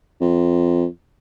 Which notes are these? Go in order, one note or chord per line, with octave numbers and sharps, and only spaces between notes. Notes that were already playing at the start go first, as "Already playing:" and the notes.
F2